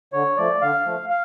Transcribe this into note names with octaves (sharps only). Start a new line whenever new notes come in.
D3 C#5
F3 A3 D5
D3 F5
F3 A3
F5